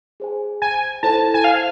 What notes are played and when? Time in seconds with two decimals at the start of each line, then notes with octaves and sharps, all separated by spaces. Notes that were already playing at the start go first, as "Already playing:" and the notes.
0.20 G#4 C5 G#5
0.62 G#5
1.03 E4 A4 C5 A5
1.34 G#5
1.44 F5